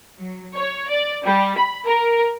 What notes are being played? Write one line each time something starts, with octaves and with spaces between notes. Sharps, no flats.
F#3
C#5
D5
G3
B5
A#4